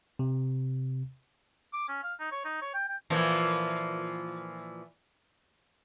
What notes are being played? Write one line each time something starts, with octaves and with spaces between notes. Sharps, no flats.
C3
D6
C#4
F5
D#4
C#5
D#4
C#5
G5
G5
A#2 E3 F3